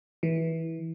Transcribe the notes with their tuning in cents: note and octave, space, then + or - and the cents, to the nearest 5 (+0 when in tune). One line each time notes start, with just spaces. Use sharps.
E3 -15